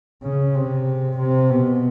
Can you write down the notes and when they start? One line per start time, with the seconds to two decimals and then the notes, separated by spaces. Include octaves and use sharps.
0.23 C#3
0.55 C3
1.18 C3
1.50 B2